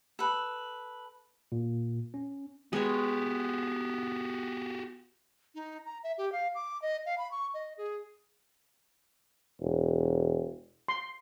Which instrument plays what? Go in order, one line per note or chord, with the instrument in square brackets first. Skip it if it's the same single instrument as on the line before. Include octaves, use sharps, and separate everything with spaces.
[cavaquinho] A4 B4
[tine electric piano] A#2
C#4
[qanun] G#3 B4 C#5 [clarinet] B3 [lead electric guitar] F#4 G4
[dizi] D#4
A#5
E5
G4
F5
D6
D#5
F5
B5
C#6
D#5
G#4
[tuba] E1
[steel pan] C6